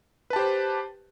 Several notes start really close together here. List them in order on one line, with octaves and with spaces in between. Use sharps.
B4 A5 G4 C5